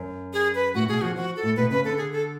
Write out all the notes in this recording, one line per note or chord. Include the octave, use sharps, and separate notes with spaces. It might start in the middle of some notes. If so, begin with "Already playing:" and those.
Already playing: F#2
G#4
B4
A2 F#4
B2 G#4
F3 F#4
F3 F#4
A4
A2
B2 B4
C#3 B4
D3 A4
G#4
A4